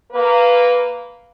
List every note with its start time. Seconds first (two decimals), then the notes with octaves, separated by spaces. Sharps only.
0.12 A#3 B4